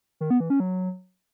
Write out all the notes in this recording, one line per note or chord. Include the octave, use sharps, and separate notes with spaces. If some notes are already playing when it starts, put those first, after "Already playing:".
D#3
B3
E3
C#4
F#3